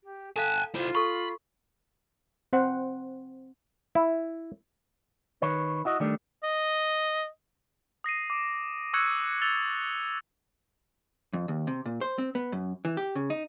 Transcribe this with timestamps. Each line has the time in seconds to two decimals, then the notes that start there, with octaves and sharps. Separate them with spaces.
0.03 G4
0.36 A4 F5 G#5 A5 F#6
0.75 E4 F4 C5
0.95 A4 B5 C#6
2.53 C4 C5 F#5
3.95 E4
5.42 D#3 B4 C#5
5.85 E4 F#4 D#5
6.00 D#3 G3 A3 D4
6.43 D#5
8.04 D#6 A#6 C7 D#7
8.30 D6 D7
8.93 C#6 D#6 E6 F#6 G#6 C#7
9.42 E6 A6 F7 G7
11.33 F2
11.48 D#2
11.67 C3
11.86 A#2
12.01 C5
12.18 C4
12.35 B3
12.52 F#2
12.85 E3
12.97 G4
13.15 C#3
13.30 D#4